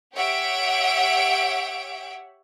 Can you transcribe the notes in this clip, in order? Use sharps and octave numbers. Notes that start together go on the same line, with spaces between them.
G4 C#5 E5 F#5 D7